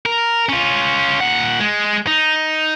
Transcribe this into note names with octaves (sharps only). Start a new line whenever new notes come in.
A#4
C#4 F4
A#2 F#5
G#3
D#4